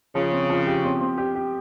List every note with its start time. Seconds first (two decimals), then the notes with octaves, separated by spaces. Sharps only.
0.15 C#3 F3
0.32 C4
0.50 F3
0.67 G4
0.84 C4
1.01 C4
1.18 G4
1.35 G4